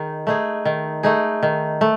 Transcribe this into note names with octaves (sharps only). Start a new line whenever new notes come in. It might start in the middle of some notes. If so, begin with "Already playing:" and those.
Already playing: D#3 D#4 G#4
A3 D#4 G#4
D#3
A3 D#4 G#4
D#3
A3